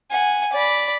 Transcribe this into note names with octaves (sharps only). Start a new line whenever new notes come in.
F#5 G#5
D5 B5